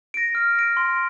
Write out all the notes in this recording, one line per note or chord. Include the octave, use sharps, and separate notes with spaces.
A#6 D7
F6
A#6 D7
C6